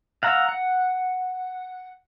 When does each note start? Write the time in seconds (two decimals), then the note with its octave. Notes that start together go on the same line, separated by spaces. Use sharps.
0.23 F5 F#5 A#5 E6
0.49 F#5